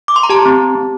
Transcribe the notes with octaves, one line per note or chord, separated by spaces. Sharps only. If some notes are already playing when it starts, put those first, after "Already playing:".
D6
C6
A#5
G4 A5
C4
G4
C4